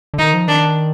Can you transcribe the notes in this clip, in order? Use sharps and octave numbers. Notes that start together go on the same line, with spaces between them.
D3
D#3 D#4
F3
D#3 D4